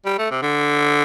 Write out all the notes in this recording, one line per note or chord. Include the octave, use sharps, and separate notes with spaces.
G3
A3
C3
D3